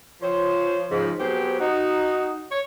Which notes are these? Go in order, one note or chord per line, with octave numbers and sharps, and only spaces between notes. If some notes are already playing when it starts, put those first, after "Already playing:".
F3 C5 C#5
G#2 C#3 F3
F#3 B3 C4 G4 G#4 C5
D#4 F#4
C#5